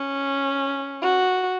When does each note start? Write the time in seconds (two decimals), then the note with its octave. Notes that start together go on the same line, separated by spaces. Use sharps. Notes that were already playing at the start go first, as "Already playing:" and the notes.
Already playing: C#4
1.02 F#4